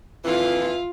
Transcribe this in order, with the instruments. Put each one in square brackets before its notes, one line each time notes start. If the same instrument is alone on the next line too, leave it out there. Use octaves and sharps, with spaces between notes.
[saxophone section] F2 E3 [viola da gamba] F4